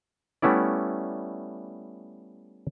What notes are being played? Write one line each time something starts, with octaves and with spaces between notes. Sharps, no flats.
G3 A3 B3 C#4 E4 D5